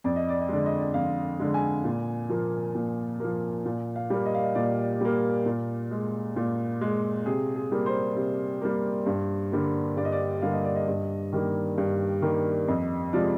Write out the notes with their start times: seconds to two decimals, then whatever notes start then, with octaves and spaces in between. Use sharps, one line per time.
0.04 F2 D5
0.16 D#5
0.29 D5
0.41 D#5
0.49 D3 G#3 D5
0.66 D#5
0.78 D5
0.94 F2 F5
1.39 D3 G#3
1.54 G#5
1.84 A#2
2.30 F3 A#3
2.75 A#2
3.20 F3 A#3
3.65 A#2
3.96 F5
4.10 G3 A#3
4.25 D#5
4.35 F5
4.43 D#5
4.55 A#2 D5
5.01 G3 A#3
5.46 A#2
5.91 G#3
6.36 A#2
6.81 G#3
7.26 C3 G#4
7.56 G#4
7.72 G3 A#3
7.86 C5
8.16 C3
8.62 G3 A#3
9.06 G2
9.52 D3 G3 A#3
9.97 G2 D5
10.05 D#5
10.12 D5
10.42 D3 G3 A#3 F5
10.53 D#5
10.65 D5
10.76 D#5
10.88 G2
11.33 D#3 G3 A#3
11.78 G2
12.22 D#3 G3 A#3
12.68 F2 D#5
13.13 C3 F3 G#3 D5